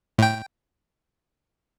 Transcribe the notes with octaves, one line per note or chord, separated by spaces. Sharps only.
A2 G5